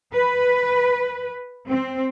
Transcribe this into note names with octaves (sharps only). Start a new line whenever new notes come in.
B4
C4